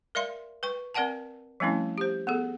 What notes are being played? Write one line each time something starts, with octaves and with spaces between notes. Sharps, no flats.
A#4 D5 E5 F5 C6
B4 G5 C#6
C4 A#4 D5 F#5 G5 A5
F3 G3 A3 C4 C#4 E4
G4 C5
B3 G#4 A4